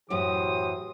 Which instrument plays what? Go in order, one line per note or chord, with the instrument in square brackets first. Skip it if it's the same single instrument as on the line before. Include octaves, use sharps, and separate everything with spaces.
[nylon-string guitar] F#2 A2 [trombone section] E3 G4 C5 [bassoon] F#3 [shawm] D#6